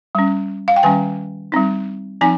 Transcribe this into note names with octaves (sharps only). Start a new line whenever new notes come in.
G3 C#4
F5
G5
D#3 G3 C#4 G#5
G3 C4 D#4
F3 C4 D#4 G#5